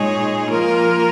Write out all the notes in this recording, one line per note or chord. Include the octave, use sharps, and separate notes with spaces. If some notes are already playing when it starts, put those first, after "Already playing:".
Already playing: A#2 G#3 D#4 G#4 C#5
F3 A#3 F4 A#4